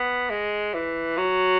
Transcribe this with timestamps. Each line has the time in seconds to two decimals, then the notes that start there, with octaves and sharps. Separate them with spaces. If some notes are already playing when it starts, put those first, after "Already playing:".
Already playing: B3
0.30 G#3
0.74 E3
1.18 F#3